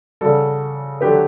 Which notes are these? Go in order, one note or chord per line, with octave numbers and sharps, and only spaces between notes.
C#3 G3 F#4 A4
D3 F#3 A3 G4 B4